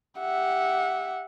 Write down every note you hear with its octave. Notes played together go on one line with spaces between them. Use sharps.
G4 E5 F#5